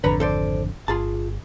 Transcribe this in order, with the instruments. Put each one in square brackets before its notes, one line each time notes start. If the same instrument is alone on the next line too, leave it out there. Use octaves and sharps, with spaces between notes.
[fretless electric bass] G#1 F2 D3 [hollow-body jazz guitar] B4 C#5 A#5
[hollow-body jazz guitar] A4 C5 D5
[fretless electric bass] G1 [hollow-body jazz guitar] F4 G#4 A5